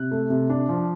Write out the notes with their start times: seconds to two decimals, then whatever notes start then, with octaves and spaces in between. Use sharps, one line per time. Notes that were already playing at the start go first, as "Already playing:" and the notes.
Already playing: C3 F#6
0.11 A3
0.30 C3
0.50 D4
0.69 F3